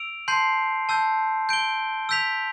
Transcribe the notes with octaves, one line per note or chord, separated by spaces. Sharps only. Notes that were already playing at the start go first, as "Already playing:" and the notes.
Already playing: E6 D7 F7
A5 C6 G6 C7
A5 E6 G6
G6 D7 G7
E6 G6 B6 F7